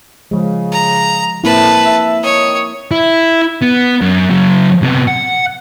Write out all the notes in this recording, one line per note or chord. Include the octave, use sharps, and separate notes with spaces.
C#3 F3 G#3
A#5
A2 A#3 C4 E4 B4 A5
E5
D#3 C#5 D#6
E4
B3
F#2
C#3 F#3
C3 B3
F#5